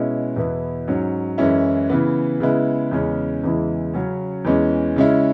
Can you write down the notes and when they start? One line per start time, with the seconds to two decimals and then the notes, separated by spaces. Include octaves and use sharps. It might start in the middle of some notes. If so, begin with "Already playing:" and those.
Already playing: B2 G#3 C#4 E4
0.36 E2 B2 B3 E4
0.88 G#2 F#3 C#4
1.38 F#2 E3 G#3 C#4 E4
1.89 C#3 E3 B3
2.40 C#3 G#3 B3 E4
2.91 E2 C#3 G#3 C#4
3.44 E2 C#3 E3 G#3 E4
3.94 C#3 F#3 C#4
4.45 E2 E3 G#3 C#4
4.96 C#3 G#3 C#4 E4